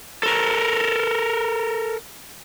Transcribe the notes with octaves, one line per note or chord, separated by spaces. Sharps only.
A4 A#4